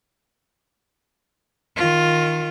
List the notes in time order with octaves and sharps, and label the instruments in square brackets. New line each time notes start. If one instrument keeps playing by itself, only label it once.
[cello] D#3 F4